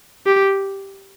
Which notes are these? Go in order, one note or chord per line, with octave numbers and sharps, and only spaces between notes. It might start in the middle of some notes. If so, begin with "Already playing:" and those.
G4